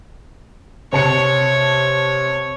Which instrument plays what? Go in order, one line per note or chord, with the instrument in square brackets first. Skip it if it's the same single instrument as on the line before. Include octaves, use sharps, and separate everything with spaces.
[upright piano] C3 A5 C#7 [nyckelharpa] C#5